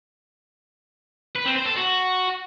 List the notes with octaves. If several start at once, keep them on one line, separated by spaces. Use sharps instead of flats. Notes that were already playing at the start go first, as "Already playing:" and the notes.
B4
C4
C5
A4
F#4